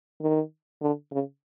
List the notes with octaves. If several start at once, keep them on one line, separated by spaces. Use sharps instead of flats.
D#3
D3
C#3